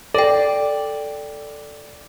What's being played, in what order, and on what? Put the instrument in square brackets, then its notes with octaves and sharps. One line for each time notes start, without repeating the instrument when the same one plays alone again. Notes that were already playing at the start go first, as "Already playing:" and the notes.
[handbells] A4 G5 [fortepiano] D5